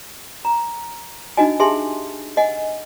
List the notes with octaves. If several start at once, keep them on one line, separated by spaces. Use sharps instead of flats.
A#5
D4 D#4 F#4 D#5 G#5
G4 G#4 E5 G#5 A5 C6
D#5 F#5 G#5